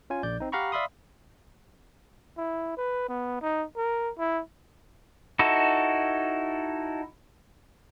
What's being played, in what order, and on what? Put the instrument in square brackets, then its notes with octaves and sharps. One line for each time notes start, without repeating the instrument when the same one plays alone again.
[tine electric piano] C#4 F4 G#5
A#1 D5 G6
C4 D#4
G4 F5 F#5 A#5 B5 C#6
D5 E5 F5 B5 C6 D#6
[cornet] E4
B4
B3
D#4
A#4
E4
[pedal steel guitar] D#4 E4 F#4 A4